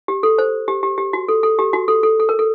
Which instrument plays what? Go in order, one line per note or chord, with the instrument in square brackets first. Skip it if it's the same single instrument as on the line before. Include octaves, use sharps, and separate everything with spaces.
[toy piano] G4
A4
C5
G4
G4
G4
F#4
A4
A4
G4
F#4
A4
A4
A4
A#4
A4